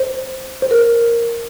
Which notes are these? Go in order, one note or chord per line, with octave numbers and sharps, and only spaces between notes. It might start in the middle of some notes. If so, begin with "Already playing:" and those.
Already playing: C5
C5
A#4